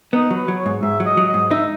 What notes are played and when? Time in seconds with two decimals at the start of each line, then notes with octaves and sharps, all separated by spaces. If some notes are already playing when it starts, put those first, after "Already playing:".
0.13 B3 D#4
0.31 F#3
0.36 B4
0.48 F#3
0.59 C#5
0.66 G#2
0.82 G#2 E5
1.00 F#3
1.06 D#5
1.17 F#3
1.29 D#5
1.34 G#2
1.51 D#4 E5